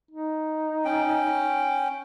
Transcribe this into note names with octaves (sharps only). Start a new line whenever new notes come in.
D#4
C#4 G5